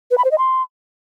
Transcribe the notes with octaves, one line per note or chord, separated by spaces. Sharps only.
B4
B5
C5
D#5
C6